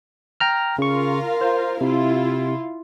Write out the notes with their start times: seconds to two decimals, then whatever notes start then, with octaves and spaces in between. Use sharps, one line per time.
0.40 G5 A#5 F6
0.78 C#3 F4 A#4 F5 C#6
1.41 C5
1.81 C3 E4 F4